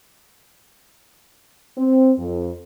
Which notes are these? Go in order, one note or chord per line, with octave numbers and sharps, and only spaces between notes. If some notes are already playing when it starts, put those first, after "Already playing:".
C4
F2